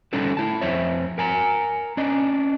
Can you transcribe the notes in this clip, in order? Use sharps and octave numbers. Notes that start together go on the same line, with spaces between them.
D3 G3 C#4 D#4 A4 B4
E4 A5
F2 C4 C5 C#5 E5
A#4 G#5 A#5
C#4 D4 D#5